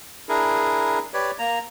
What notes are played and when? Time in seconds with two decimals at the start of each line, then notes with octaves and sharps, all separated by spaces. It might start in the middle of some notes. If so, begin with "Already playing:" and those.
0.29 D4 E4 G#4 A#4
1.14 G4 B4 C#5 D5
1.39 A#3 A#5